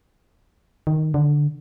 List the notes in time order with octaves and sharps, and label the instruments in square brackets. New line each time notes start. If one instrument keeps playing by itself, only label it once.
[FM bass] D#3
D3